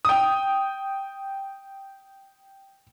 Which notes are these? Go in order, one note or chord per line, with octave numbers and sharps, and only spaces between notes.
G5 D#6